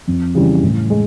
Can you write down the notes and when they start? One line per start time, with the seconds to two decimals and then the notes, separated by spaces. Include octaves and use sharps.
0.08 F2
0.34 C#3 E3 G3
0.63 A2
0.90 G#3